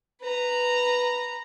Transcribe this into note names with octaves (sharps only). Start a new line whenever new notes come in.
B4 A#5